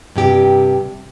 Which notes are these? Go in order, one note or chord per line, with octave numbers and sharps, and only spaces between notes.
G2 C3 G4